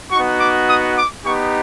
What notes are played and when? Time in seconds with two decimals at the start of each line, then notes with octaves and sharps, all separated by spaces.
0.11 B3 D#4 F#4 C#6
0.40 D6
0.68 D#6
0.96 D6
1.24 B3 D#4 G4 C#6